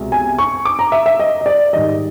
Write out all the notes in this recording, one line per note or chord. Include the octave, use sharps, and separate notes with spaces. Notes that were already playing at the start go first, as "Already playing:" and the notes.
Already playing: C2 B2 G#3
G#5
C#6
D6
A#5
E5
E5
D#5
D#5
D5
G#2 D#3 G3 D#5